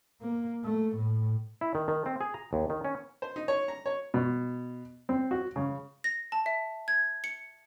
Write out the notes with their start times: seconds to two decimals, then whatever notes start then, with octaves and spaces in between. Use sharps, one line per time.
0.21 A#3
0.64 A3
0.96 A2
1.61 E4
1.75 D#3
1.88 D#3
2.06 C4
2.21 G#4
2.34 A#5
2.53 D#2
2.70 D#3
2.85 C#4
3.22 C5
3.36 D#4
3.48 C#5
3.68 A#5
3.86 C#5
4.14 B2
5.09 C4
5.31 F#4
5.56 C#3
6.04 A#6
6.32 A5
6.46 E5
6.88 G#6
7.24 C#7